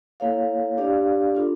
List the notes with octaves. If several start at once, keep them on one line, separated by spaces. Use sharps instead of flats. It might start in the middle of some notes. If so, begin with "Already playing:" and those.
A#3 E4 A4 C#5 F5
D4 G4 D5 F5
D4 F4 A4